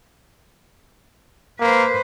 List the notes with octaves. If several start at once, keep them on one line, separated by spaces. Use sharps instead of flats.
A#3 B4 C5